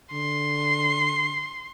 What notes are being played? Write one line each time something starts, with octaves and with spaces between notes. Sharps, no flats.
D3 C6